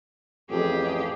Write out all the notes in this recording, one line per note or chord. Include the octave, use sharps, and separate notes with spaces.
A1 F2 G4 G#4